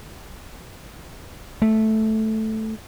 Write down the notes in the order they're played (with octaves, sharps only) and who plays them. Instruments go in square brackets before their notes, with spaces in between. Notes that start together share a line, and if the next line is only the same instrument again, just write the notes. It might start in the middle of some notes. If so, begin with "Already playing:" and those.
[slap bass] A3